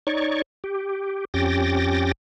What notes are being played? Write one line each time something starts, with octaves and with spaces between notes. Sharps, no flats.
D#4 C#5 D5 C#6
G4
F2 C#4 G4 G5 A6 A#6